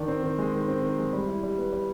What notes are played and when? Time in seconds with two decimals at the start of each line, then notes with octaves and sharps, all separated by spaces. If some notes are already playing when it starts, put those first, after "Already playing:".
Already playing: D#3 D4
0.08 C4
0.23 D#3
0.38 G#3
0.53 D#3
0.68 C4
0.82 D#3
0.98 G#3
1.13 G3
1.27 E4
1.43 G3
1.58 B3
1.72 G3